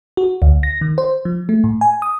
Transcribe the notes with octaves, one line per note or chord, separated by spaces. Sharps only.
F#4
D2
A#6
D#3
C5
F3
A3
A2
G#5
D#6